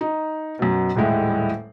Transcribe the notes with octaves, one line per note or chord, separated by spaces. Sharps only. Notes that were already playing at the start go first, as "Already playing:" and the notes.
D#4
F#2 B2
D#1 A2 G3 G#3 E4